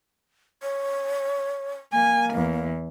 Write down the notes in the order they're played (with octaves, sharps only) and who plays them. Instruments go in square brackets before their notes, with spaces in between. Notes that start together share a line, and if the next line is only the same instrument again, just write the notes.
[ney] C#5
[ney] A#3 [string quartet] G#5
[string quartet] E2